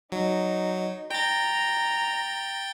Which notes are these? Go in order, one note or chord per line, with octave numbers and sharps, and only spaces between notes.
F#3 D#4
G5 A#5 A6